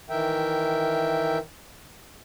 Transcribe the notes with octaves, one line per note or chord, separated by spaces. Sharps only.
D#3 E3 A#4 E5 G5